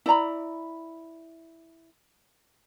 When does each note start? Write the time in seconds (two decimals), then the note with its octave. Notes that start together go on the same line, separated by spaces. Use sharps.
0.06 E4 D5 A#5 B5